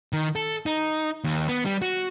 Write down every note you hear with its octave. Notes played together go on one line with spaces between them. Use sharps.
D#3
A4
D#4
D#2
B3
G3
F#4